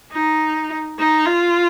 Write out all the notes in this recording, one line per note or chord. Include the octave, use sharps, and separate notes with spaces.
D#4
D#4
F4